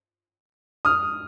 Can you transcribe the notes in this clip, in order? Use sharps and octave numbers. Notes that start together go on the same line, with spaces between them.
D#6 F6